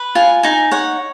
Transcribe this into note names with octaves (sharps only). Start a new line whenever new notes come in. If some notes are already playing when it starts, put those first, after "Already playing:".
Already playing: B4
F4 G#5
D#4 G#5
C#5 F#5